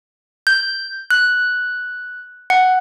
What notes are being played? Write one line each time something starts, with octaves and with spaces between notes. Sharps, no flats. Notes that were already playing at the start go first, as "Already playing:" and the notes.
G6
F#6
F#5